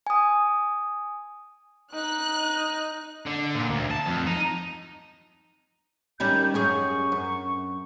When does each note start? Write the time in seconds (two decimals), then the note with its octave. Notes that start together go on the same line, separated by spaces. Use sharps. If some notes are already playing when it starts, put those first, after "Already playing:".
0.07 G#5 D#6
1.94 D#4 F#6
3.26 D3
3.55 A#2
3.70 D2
3.91 A5
4.06 F2
4.27 D#4
6.20 D#3 G3 C#4 G6
6.54 F#2 C#4 G#4 C#6
7.12 F#2